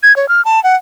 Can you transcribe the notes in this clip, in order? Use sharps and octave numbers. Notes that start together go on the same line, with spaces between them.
G#6
C#5
F6
A5
F#5